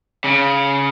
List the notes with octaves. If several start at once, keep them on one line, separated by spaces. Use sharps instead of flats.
C#3